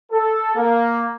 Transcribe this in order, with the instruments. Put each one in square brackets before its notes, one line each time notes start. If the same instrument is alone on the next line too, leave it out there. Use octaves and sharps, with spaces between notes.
[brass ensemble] A4
A#3